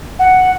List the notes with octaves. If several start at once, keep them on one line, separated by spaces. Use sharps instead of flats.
F#5